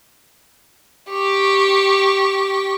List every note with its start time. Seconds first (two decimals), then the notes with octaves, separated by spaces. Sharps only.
1.10 G4 C#6